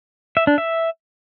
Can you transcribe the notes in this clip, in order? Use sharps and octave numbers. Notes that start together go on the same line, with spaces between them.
E5
D4
E5